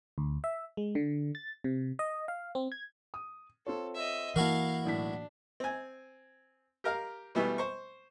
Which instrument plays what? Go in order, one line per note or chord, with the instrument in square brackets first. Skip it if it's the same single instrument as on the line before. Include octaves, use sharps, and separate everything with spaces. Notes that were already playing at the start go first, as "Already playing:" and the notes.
[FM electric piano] D2
E5
G#3
D3
A6
C3
D#5
F5
C4
G#6
[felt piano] D#6
[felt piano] C4 F4 C#5 [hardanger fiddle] A4
[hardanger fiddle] D#5 E5
[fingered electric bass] E3 A#3 [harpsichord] E4 F#4 A#4 [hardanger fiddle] F5 [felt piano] F#5 A5
[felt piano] B1 A2 B6 [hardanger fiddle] D4
[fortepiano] C4 G#5
G4 A#4 F5
B2 E3 G3 A3 B3 E4
C5 C#6